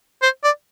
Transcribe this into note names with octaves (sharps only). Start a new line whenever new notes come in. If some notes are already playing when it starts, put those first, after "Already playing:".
C5
D5